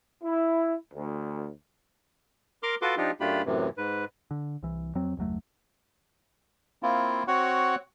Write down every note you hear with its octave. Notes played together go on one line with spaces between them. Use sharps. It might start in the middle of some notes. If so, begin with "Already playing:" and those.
E4
D2
A#4 C6 D6 F6
F4 F#4 A4 B4 C6 D6
F3 D4 D#4 F4 G4
F#2 A3 D4 F4 G4 B5
F#2 A2 C3 E3
G#2 B4
D3
C2 E3
F2 F#3 C4
F#1 D#2 F#3 A3
A#3 C4 E4 F4
C4 F#4 C#5 F#5